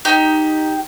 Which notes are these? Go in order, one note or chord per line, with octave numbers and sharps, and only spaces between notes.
D#4 G4